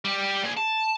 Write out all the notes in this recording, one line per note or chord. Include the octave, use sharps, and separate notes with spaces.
G3 G4
A#2 G#4
A5